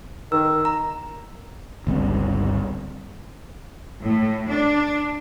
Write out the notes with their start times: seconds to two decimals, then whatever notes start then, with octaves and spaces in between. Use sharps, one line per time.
0.32 D#3 E6
0.65 A#5
1.87 G1 C#2 G2 C4
4.04 A2
4.49 D4